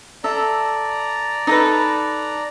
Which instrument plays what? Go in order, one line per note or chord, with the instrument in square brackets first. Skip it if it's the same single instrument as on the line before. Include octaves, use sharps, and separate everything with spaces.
[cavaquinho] A4 E5 [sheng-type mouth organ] D5 A#5
[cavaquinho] D#4 A4 B4